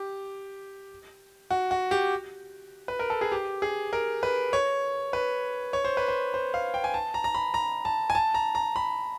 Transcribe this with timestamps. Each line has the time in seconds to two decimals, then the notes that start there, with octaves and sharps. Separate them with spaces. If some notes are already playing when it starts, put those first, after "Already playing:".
Already playing: G4
1.51 F#4
1.71 F#4
1.91 G4
2.88 B4
2.99 A#4
3.10 A4
3.21 G#4
3.32 G4
3.62 G#4
3.93 A#4
4.23 B4
4.53 C#5
5.13 B4
5.73 C#5
5.85 C5
5.97 B4
6.08 C5
6.34 C5
6.54 F5
6.74 G5
6.84 G#5
6.94 A5
7.14 A#5
7.24 A#5
7.35 B5
7.54 A#5
7.85 A5
8.10 G#5
8.15 A5
8.34 A#5
8.55 A#5
8.76 B5